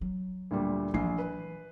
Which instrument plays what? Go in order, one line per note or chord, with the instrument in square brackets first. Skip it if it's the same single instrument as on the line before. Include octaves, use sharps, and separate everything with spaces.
[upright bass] F#3
[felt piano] D2 A#2 G3
[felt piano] A#1 C7 [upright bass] E3 F#3
[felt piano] B4